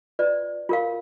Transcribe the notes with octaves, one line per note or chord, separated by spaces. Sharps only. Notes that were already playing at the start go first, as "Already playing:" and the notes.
F4 B4 D5
F4 A#4 F5